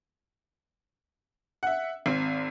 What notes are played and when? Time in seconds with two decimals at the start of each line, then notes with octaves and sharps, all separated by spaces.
1.63 E5 F#5
2.06 G#1 C4